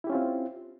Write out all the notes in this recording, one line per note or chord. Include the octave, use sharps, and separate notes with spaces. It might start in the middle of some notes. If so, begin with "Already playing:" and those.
C4 C#4 E4 F4 G4